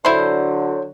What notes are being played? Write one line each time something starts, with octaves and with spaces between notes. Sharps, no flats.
D3 F#3 E4 C5